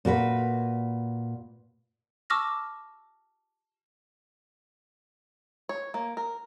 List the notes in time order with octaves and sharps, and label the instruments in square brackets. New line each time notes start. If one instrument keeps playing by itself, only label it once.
[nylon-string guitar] A#2 F#4 A#4 B4
[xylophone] A5 C#6 D6 E6 F6 A#6
[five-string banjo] C#5
A#3
A#4